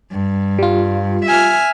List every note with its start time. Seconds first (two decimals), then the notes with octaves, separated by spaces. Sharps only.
0.12 G2
0.59 G3 F4
1.26 E5 G#5 F6